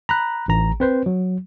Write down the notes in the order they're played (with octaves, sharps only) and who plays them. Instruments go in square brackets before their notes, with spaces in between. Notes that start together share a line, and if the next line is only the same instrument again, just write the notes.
[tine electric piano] A#5 B5 F#6
A1 A#5
C4 B4 C5
F#3